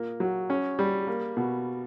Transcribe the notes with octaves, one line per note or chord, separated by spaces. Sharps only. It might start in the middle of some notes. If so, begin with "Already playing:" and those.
Already playing: A#2 A#3
F#3
C#4
G3
A#3
B2